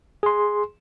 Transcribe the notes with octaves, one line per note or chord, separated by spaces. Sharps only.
G#4 C6